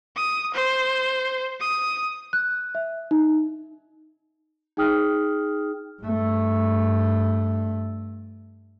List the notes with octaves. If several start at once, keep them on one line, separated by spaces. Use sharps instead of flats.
D#6
C5
D#6
F#6
E5
D#4
D#4 G#4 G5 D#6 F6
G2 A3